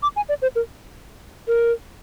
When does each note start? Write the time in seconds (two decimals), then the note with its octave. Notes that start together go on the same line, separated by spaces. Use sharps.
0.03 D6
0.16 G#5
0.29 D5
0.42 C5
0.56 A#4
1.48 A#4